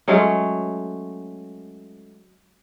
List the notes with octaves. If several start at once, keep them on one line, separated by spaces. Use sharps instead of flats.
F#3 G#3 A3 C#4